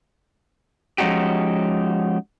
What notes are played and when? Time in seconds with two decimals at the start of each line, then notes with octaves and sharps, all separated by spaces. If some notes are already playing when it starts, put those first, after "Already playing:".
0.98 F3 G#3 C#4 D#4 F#4 G4